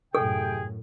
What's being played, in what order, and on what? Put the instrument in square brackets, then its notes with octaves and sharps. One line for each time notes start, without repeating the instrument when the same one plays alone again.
[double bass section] F#2 A2 [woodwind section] C3 G5 [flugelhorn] G#4 [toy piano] A4